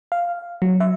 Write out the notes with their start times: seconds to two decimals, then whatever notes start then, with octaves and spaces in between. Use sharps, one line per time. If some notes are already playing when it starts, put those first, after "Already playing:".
0.12 F5
0.62 F#3
0.80 E5